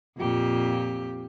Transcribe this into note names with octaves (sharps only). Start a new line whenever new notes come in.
F2 A#2 G4